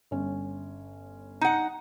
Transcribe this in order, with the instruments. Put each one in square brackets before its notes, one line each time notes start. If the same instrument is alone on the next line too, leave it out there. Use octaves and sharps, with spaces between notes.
[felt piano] G1 C#4
[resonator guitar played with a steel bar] D#4 F#5